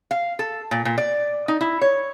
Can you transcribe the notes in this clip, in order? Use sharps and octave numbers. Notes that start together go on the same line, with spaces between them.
F5
A4
A#2
A#2
D5
D#4
E4
C#5